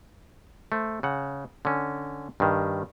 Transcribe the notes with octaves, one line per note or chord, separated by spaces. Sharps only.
A3 C5
C#3 F#5
D3 C#4
G2 D#3